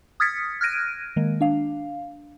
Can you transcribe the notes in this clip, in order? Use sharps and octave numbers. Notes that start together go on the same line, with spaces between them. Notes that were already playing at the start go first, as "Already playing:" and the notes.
D#6 F6 G#6 A6 B6 C#7
F6 F#6 G#6 A#6 D7 D#7
D#3 G#3 A#3
D4 F5